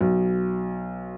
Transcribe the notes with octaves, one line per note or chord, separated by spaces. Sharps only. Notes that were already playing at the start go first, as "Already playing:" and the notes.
B1